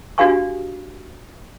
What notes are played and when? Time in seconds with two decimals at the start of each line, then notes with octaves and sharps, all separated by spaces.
0.18 D4 F#4 G4 F5 G#5 C#6